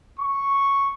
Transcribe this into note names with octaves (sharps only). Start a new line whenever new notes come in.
C#6